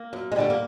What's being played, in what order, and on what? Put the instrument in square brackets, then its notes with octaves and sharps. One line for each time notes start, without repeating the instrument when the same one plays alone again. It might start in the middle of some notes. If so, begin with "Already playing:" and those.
Already playing: [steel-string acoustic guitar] A#3
F#2
G#3
D3 G3 A3
A#3